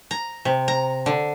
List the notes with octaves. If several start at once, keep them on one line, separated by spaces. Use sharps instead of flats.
A#5
C3
A#5
D3